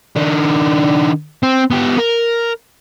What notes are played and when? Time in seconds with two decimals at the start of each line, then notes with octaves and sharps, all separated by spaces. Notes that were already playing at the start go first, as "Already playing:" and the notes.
0.16 D#3 D4
1.43 C4
1.71 B3 G4
1.98 A#4